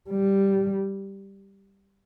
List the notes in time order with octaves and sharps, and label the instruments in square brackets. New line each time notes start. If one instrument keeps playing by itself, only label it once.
[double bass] G3